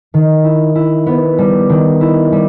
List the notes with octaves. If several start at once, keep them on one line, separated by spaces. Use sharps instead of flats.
D#3
E4
E4
B3
G3
D#3
E4
G3